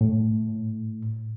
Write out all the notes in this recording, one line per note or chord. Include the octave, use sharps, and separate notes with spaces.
A2